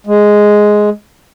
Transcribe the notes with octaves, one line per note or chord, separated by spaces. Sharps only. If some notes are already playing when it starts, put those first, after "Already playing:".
G#3